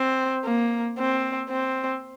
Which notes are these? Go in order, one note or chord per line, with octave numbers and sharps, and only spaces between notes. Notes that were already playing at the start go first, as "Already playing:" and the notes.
Already playing: C4
A#3
C4
C4